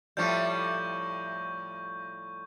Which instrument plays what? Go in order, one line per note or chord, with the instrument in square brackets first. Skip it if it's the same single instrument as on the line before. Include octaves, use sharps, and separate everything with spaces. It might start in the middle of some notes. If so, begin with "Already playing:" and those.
[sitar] A2 F3 G3 [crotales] C#6 G6